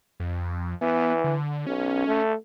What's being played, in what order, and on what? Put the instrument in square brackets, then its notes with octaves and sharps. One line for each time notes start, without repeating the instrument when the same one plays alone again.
[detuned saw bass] F2
[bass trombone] E3 [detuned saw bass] B3
[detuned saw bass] D3
[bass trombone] B1 [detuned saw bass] C#4
[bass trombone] A3